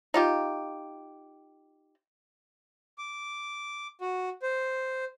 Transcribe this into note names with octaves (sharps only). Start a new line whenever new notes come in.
D#4 F4 G4
D6
F#4
C5